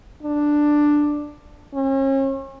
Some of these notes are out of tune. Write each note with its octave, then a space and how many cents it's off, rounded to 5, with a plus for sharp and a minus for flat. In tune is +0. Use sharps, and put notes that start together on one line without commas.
D4 +5
C#4 -40